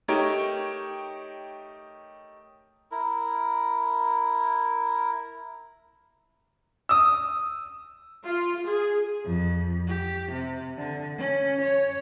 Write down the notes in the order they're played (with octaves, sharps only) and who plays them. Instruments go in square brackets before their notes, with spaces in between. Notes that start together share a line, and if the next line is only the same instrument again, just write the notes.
[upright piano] A3 D#4 G4 A#4 C#5 G5
[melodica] E4 A#4
[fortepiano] D#6 E6
[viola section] F4
G#4
[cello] F2
G4
C3
D3
C#4
C#5